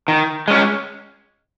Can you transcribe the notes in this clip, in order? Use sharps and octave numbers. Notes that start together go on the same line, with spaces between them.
D#3
G#3 C#4